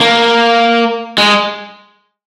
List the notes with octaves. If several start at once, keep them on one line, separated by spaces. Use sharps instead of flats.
A#3
G#3